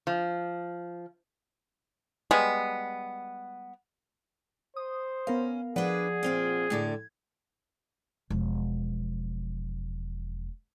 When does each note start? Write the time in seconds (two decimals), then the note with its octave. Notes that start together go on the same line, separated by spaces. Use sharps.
0.07 F3
2.31 G3 G#3 B3
4.76 C5 D#6
5.27 B3 C#4 A#4 F5
5.76 F3 D4 G#4 B4 D5 F#5
6.23 A#2 C4 F4
6.70 A2 D3 D5 G#6
8.30 E1 F3